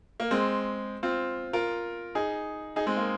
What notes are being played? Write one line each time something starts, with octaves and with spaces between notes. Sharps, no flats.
A#3
G#3 C4
C4 F4
F4 A#4
D#4 G#4
D#4 G#4
G#3 C4
A#3